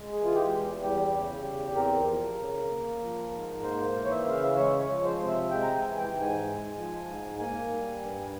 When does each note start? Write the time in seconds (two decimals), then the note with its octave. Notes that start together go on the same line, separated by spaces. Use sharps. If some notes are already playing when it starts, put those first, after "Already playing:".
Already playing: G#3
0.12 G#4
0.20 E3 F4
0.35 G4
0.51 E2
0.82 G3 G4
1.14 C#3
1.44 E2
1.75 C4 A#4
2.07 F3
2.38 C#3
2.70 A#3
3.01 F3
3.32 G#2
3.63 A#3 C5
3.94 E3
4.04 C#5
4.11 E5
4.26 C#3 F5
4.43 E5
4.57 G#3 C#5
4.80 C#5
4.89 F3
5.05 C5
5.19 C3
5.28 E5
5.50 G#3 G5
5.63 A#5
5.75 G#5
5.82 E3
5.97 G5
6.14 G#2
6.21 G#5
6.44 G#3
6.76 F3
7.06 G#2
7.39 A#3 G#5
7.70 G3
8.00 G2